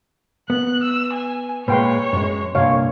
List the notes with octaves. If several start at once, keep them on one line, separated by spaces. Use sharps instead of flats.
B3 F#6
E6
G#5
A#2 G#3 B4 C#5 G5 C6
F#2 G#3
C2 G2 A#2 C#5 D#5 F5